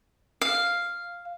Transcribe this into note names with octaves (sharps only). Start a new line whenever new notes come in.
F5